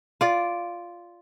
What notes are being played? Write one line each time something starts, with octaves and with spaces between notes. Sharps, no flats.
F4 D5